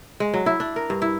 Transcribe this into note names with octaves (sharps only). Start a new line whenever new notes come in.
G#3
F#3
E4
D4
A#4
G2
E4